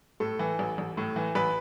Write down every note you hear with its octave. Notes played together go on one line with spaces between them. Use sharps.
A2 A4
E3
A1
A1
A2
E3
A1 B4